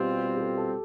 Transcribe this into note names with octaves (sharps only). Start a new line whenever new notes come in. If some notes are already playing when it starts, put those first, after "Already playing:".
Already playing: B2 G3 C4 F4 G4
G4
A4
A4